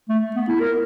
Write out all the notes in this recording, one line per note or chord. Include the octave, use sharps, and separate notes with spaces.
A3
B3
E4
A#4